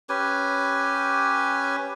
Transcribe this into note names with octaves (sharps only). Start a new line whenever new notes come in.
C#4 G4 B4 G#5